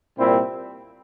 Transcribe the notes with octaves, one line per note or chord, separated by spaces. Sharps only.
C2 A#2 G3 C4 E4